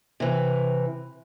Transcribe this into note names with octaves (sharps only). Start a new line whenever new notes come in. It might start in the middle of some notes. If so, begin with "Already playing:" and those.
C3 E3